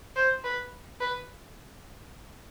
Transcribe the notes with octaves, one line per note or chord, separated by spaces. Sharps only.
C5
B4
B4